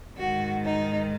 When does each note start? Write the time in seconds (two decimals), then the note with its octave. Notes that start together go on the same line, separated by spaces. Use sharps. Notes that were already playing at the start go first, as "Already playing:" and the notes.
0.17 G#2 D#3 F#4
0.63 D#4